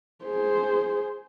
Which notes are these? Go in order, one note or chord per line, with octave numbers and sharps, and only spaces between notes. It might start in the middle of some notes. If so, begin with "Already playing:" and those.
G#4 C5